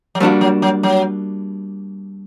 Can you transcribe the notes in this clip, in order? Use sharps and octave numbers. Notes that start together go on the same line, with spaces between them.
F#3
F3 G3 A#3 D4 F#4
F#3
F#3
F#3